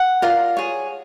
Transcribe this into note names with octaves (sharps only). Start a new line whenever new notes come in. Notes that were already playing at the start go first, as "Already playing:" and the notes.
Already playing: F#5
F4 A#4 D5
G#4 C#5